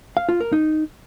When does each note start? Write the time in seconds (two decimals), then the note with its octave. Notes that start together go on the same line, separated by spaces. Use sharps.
0.17 F5
0.29 F4
0.41 A#4
0.52 D#4